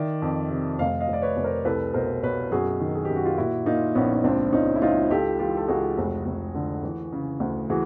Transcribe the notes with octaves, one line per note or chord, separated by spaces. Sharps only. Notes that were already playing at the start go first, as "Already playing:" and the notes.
Already playing: D#3 D5 E5
F2
C3
F1 D#5 F5
D#5 F5
F1
D5
B4 C#5
F1
A#4 C5
C2 A4 B4
B2 A#4 C5
B2 B4 C#5
F#2 F#4 G#4
D#3
G#4
F#2 G4
F#4
F4 G4
A#2 E4 F#4
A#2 D#4 F4
A#1 B3 C#4
D#4
C#2 C4 D4
C#2 C#4 D#4
E4
C#2 D#4 F4
C#2 G4 A4
E3 F4 G4
A4
C#2 F#4 G#4
F1
F1
D3
E3
C#3
D2
E3 F#4 G#4